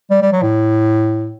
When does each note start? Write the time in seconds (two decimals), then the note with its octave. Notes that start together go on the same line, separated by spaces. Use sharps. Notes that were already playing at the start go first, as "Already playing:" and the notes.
0.10 G3
0.22 G3
0.32 F#3
0.42 A2